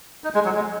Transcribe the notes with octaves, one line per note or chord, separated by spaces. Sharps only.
D#4
G#3
F#3
G#3